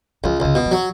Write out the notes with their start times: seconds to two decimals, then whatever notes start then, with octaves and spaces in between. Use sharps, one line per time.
0.24 C#2 F3
0.40 C#2 C#3
0.55 B2
0.66 F3
0.71 F#3